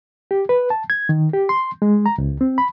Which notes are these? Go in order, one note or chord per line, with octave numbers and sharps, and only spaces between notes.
G4
B4
A5
G#6
D#3
G4
C6
G#3
A#5
C#2
C4
B5